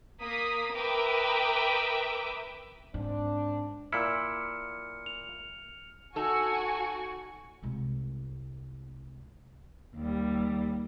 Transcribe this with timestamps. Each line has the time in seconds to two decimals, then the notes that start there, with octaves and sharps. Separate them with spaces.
0.22 A#3 D#6 B6
0.74 A#4 B4 E5 G5 D6 D#6
2.94 G#2 C4 D4
3.93 A#2 E4 F6 C#7
5.06 F7
6.16 D#4 F#4 A4 G#5 C#6
7.63 C2 G#3
9.96 D#2 G3